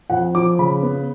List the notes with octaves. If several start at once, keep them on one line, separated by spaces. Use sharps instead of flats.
F2 F#5
F3 D6
C#3 B5
B3